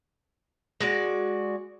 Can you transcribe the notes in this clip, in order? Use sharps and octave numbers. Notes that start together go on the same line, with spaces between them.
G#3 F#4 D5